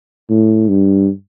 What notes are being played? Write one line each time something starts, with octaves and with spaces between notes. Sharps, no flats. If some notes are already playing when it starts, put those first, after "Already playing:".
A2
G2